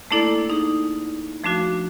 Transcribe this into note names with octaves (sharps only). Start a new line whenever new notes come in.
A3 A#3 D4 E4 A4 D5
D#4 G#4
F3 A3 D4 F#4